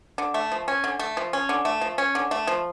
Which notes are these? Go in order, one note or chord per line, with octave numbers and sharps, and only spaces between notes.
D3
A3
F3
C#4
D3
A3
F3
C#4
D3
A3
F3
C#4
D3
A3
F3